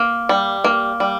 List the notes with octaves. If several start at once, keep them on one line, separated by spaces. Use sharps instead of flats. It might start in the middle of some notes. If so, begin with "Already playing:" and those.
Already playing: A#3
G3
A#3
G3